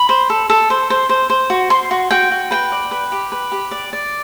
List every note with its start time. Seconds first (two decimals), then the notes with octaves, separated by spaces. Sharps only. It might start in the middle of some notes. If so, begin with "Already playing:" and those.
Already playing: B5
0.09 C5
0.30 A4
0.50 A4
0.70 C5
0.90 C5
1.09 C5
1.30 C5
1.50 F#4
1.70 C5 C6
1.91 F#4
2.11 F#4 G5
2.32 F#4
2.51 B4 G5
2.72 D5
2.91 B4
3.12 G4
3.32 B4
3.52 G4
3.71 D5
3.93 D5